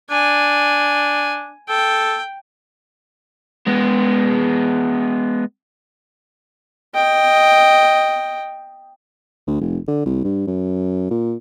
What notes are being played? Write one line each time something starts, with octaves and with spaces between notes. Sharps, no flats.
D4 G#5
A4 G5
G#3 B3
D#5 G5
D2
F1
D3
C2
G2
F#2
A#2